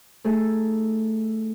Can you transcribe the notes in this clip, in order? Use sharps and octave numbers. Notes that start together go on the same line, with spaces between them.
A3 D#4 G#4 A4